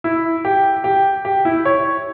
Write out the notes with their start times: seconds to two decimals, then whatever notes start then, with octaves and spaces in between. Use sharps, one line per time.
0.04 E4
0.45 G4
0.84 G4
1.25 G4
1.45 E4
1.65 C#5